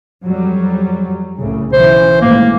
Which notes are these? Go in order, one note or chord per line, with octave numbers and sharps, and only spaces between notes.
F2 F#3 G3
C2 A2 C#3
B1 C#3 E3 C5
G#1 A2 E3 A#3